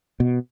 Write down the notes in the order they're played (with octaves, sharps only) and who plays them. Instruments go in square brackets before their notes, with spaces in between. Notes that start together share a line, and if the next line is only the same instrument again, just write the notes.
[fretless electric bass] B2